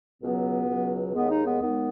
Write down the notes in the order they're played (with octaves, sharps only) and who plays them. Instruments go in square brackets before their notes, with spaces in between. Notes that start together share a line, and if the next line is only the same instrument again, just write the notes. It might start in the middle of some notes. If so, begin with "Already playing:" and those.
[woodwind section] C#2 B2 F#3 B3
C#2 B2 F#3
D#2 D#3 G#3 B3
D#4
B3
D#2 D#3 G#3 B3